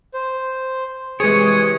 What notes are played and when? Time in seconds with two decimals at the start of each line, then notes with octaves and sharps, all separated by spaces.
0.14 C5
1.20 C3 E3 G#3 G#4 C#5 D#6